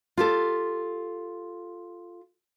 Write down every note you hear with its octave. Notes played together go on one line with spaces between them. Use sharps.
F4 G4 A4